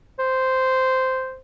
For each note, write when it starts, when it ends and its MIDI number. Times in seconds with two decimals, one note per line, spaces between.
0.19 1.40 72